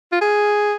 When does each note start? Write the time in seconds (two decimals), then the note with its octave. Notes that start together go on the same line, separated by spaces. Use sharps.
0.12 F4
0.21 G#4